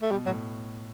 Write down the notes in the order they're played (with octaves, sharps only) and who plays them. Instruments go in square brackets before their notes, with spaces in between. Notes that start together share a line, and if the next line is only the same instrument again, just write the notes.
[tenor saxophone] A3
[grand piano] B2 [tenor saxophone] G3
[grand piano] A2 [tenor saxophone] F#3